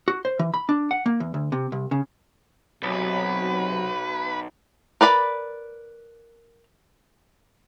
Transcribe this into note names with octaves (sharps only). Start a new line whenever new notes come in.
F#4
C5
E3
B5
D4
F#5
A#3
E2
D2
C3
C2
C#3
B1 C3 F#3 B4
A#4 B4 D5 B5